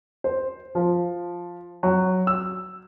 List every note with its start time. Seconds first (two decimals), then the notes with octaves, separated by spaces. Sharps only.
0.24 C5
0.75 F3
1.83 F#3
2.27 E6